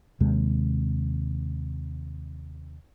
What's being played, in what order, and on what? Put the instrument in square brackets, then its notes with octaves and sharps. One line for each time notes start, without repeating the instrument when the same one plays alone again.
[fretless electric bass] D#2 C3 G#3